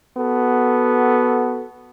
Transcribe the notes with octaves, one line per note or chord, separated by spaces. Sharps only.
B3 F#4 A4